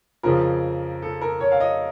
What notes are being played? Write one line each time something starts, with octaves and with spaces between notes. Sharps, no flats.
F2 C#3 F3 A#4
A4
A#4
C#5
F5
D#5